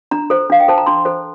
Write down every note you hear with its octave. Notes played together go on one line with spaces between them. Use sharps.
D4 A#5
A4 C5
D4 F5
G5
A4 C5 A5
A#5
D4 C6
A4 C5